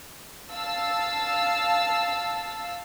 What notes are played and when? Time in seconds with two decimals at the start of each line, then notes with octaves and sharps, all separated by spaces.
0.53 F5 A5 E6